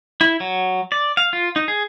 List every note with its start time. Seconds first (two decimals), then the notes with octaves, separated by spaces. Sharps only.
0.21 E4
0.40 F#3
0.92 D5
1.17 F5
1.33 F4
1.56 D#4
1.68 G#4